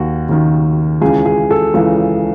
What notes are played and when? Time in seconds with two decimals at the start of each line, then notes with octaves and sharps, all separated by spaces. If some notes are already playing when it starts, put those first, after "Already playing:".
Already playing: D#2 D#3 F#4
0.29 D#2 D#3
1.02 C#2 C#3 E3 G#4
1.26 G#4
1.51 A4
1.74 C#2 C#3 E3